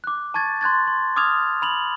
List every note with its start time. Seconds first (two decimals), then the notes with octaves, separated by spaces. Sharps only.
0.04 D6 F#6
0.34 A5 C#6 G#6 A6
0.61 C6 F#6 G#6 A6
0.87 C6
1.16 D6 D#6 F6 G#6 F7
1.62 B5 F7 F#7